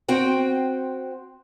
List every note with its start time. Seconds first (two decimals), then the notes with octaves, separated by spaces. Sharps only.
0.08 C4 F#4 G5